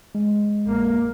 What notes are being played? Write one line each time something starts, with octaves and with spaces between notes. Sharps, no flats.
G#3
A#1 A#3